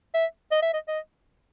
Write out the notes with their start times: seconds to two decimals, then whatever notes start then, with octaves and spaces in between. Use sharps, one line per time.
0.14 E5
0.51 D#5
0.62 E5
0.73 D#5
0.88 D#5